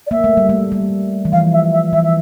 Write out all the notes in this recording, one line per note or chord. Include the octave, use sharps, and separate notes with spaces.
D5
A#3 E5
A3
G3
A3
G3
E3
F3 F5
E5
E5
E3 E5
E5